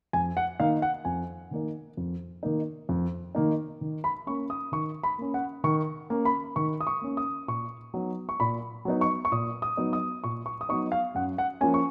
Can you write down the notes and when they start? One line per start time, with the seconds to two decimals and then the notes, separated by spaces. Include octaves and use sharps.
0.13 F2 G#5
0.37 F#5
0.60 D#3 A#3 D#4 F5
0.82 F#5
1.05 F2 G#5
1.51 D#3 A#3 D#4
1.97 F2
2.43 D#3 A#3 D#4
2.89 F2
3.35 D#3 A#3 D#4
3.81 D#3
4.04 B5
4.27 A#3 C#4 C#6
4.50 D#6
4.72 D#3 C#6
5.03 B5
5.19 A#3 C#4
5.34 F#5
5.64 D#3 C#6
6.10 A#3 C#4
6.25 B5
6.56 D#3 C#6
6.81 D#6
6.87 C#6
7.02 A#3 C#4
7.17 D#6
7.48 A#2 C#6
7.94 F#3 B3 D#4
8.29 C#6
8.40 A#2 B5
8.85 F#3 B3 D#4
9.01 C#6
9.25 C#6
9.32 A#2 D#6
9.62 D#6
9.77 F#3 B3 D#4
9.93 D#6
10.24 A#2 C#6
10.46 C#6
10.61 D#6
10.69 F#3 B3 D#4 C#6
10.92 F5
11.15 F#2 F#5
11.38 F#5
11.61 F3 A#3 C#4 G#5
11.74 C#6